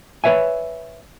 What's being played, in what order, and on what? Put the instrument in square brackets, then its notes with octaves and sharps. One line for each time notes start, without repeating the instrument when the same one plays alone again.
[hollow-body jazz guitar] B4 C#5 E5 G#5